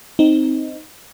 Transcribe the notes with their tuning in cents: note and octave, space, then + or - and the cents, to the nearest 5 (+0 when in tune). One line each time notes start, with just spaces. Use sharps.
C4 +0 D#4 +0